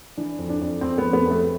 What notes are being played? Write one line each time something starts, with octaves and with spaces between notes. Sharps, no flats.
E3 D4
F2
D4
F2
F2 C4
F2 B3
B3
F2
A3